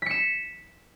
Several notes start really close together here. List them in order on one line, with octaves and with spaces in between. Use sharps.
B6 C#7 E7